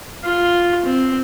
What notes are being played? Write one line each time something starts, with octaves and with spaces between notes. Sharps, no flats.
F4
C4